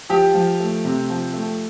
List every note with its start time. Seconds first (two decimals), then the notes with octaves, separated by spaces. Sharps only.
0.09 F3 G4
0.34 F3
0.60 A3
0.85 C3
1.10 F3
1.34 A3